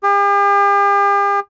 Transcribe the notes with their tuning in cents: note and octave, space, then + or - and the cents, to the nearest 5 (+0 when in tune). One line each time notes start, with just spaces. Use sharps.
G4 +45